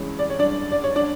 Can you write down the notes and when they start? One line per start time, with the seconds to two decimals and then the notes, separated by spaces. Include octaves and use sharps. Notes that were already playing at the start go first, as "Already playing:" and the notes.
Already playing: G2 E3 G#3 C#4
0.19 D5
0.30 C#5
0.39 D4 D5
0.72 D5
0.84 C#5
0.96 D4 D5